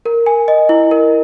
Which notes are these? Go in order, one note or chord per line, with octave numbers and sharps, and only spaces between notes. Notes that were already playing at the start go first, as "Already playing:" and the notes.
A#4
G#5
D#5
E4
A#4